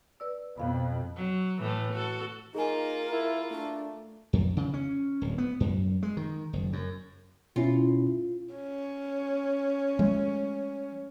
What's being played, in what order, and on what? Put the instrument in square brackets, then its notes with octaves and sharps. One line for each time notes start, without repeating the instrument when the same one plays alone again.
[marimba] B4 D5 E6
[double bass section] F2 B2 [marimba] B3 F5 B5
[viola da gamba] F#3
A2 E3 A3
F#4 A4
[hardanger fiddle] A#3 F4 [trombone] D#4 [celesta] G#4 G#5 [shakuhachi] A#4
[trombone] E4
[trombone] A3 [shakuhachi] D4
[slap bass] F2
C#3
C#4
D1
B3
F#2
G#3
D#3
F#1
F#2
[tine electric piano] B2 C#4 E4 [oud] F4
[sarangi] C#4
[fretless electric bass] F3 G#3 A3